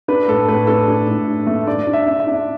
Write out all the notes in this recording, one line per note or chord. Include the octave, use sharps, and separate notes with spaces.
D4 B4
A2 A4
A2 B4
D4 A4
D4
A2
D4
A3
D4 D5
D4
E5
D4
E5
D4